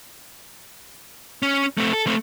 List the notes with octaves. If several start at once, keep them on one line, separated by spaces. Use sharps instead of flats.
C#4
A3 C4
A4
A3 C4